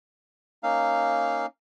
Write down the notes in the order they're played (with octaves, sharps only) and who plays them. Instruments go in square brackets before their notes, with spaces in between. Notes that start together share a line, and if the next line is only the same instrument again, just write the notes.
[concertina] A#3 C#4 D#4 F5